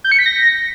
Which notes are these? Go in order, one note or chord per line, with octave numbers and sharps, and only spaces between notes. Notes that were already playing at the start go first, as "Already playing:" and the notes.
G6
C#7
B6
A#6